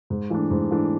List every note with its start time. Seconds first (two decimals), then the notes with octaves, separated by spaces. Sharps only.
0.10 G#2
0.30 E3 A3 D4
0.51 G#2
0.71 E3 A3 D4